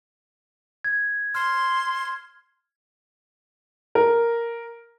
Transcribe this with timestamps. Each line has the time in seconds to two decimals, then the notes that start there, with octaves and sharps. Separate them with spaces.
0.85 G#6
1.35 C6 F6
3.95 A#4